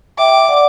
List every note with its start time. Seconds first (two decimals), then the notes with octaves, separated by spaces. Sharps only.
0.18 E5 G5 D6
0.49 D5 F#5